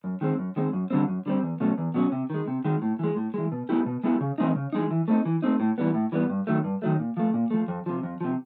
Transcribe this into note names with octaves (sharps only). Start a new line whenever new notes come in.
F#2
D#3 G#3 C4
F#2
D#3 G#3 C4
F#2
D3 G3 C4
F#2
D3 G3 C4
E2
B2 F#3 A3 C#4
E2
B2 F#3 A3 C#4
C3
D#3 G#3
C3
D#3 G#3
A2
E3 G#3
A2
E3 G#3
B2
G#3 B3 E4 G4
B2
G#3 B3 E4 G4
C#3
E3 G#3 C4 D#4
C#3
E3 G#3 C4 D#4
E3
A3 C4 D#4
E3
A3 C4 D#4
A2
E3 G3 B3
A2
E3 G3 B3
G2
D#3 F#3 A3
G2
D#3 F#3 A3
A#2
F3 A3
A#2
F3 A3
F2
C3 F3
F2
C3 F3